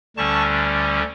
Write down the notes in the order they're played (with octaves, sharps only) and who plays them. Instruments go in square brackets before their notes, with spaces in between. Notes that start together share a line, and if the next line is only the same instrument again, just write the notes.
[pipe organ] D2 D3 G3 C#4 A5 C#6